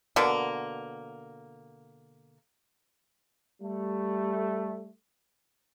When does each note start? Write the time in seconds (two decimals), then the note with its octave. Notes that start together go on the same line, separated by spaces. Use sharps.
0.16 B2 D3 A#3
3.62 G3 A3